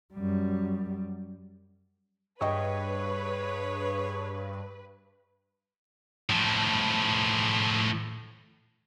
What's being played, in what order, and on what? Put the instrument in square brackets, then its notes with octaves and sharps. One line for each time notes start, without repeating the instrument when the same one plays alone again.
[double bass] F#2 G3
[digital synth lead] G2 [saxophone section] G#4 C#5 [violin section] B4 [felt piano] D#5 G5 C#6
[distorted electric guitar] A2 F3